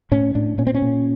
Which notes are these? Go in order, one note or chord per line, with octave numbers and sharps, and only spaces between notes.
A2 C#4
A2 D4
A#2 C#4
C4
C#4
A#2